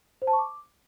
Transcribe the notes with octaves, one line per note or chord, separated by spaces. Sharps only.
C5
A5
C#6
D6